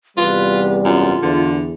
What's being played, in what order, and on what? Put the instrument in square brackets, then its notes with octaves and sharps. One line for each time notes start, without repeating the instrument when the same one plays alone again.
[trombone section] E2 C3 G3 [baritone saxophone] F4 [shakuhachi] B4
[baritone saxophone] F#2 [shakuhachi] F4
[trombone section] E2 [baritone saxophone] D3